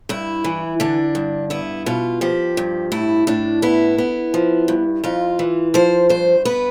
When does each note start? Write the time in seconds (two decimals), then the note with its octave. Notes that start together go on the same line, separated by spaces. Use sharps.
0.09 G2 E4
0.44 E3
0.80 D3 D4
1.15 G2
1.50 B3 E4
1.86 B2 F4
2.21 F3 G4
2.57 G2
2.92 A2 E4
3.27 A2 D4
3.62 B3 E4
3.98 B3
4.34 F3
4.68 G2
5.04 F2 F4
5.39 E3
5.74 F3 C5
6.09 G2 C5
6.45 B3 B4